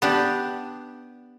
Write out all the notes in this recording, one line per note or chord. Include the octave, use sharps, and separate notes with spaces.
B3 D4 G4